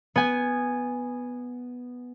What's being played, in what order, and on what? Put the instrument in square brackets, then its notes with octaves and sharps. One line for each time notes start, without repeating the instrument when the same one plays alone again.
[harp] B3 G#5